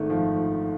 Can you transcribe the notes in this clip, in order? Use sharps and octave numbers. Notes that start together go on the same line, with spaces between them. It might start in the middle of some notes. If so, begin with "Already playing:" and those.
Already playing: G#1 G#2 A3
F3